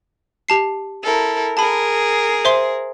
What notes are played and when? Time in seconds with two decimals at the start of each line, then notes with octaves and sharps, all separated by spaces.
0.49 G4 A5 C7
1.03 E4 A4 A#4
1.57 G#4 A#4 A5 B5
2.45 C5 E5 C6